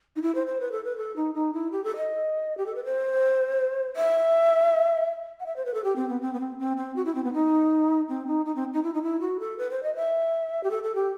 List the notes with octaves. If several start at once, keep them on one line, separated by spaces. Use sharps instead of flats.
D#4
E4
C5
C5
B4
A4
B4
A4
D#4
D#4
E4
G4
A4
D#5
G4
A4
B4
C5
E5
F#5
E5
C5
B4
A4
G4
C4
B3
C4
B3
C4
C4
C4
F#4
E4
C4
B3
D#4
C4
D#4
D#4
C4
D#4
E4
D#4
E4
F#4
A4
B4
C5
D#5
E5
G4
A4
A4
G4